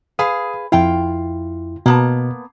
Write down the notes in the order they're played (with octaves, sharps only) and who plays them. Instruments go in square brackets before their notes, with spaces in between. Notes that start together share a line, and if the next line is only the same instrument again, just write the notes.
[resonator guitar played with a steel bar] G#4 B4 F5 [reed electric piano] D#6
[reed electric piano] F2 E4 [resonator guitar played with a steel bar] F4 G5
[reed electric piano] B2 [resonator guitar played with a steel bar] A#3 B3 A5